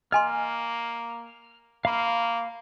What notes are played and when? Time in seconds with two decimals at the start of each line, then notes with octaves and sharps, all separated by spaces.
0.12 A#3 D#5 G#5 C6 F6
1.85 A#3 F5 B5 F6